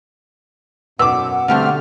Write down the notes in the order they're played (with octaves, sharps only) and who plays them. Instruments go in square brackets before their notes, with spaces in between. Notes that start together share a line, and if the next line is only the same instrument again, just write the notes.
[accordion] F#2 [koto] B2 [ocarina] F#5 [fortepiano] D6 E6
[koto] D3 G3 D4 [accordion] A3 C4 F6